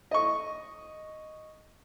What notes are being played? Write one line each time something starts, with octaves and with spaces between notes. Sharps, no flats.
D#5 C#6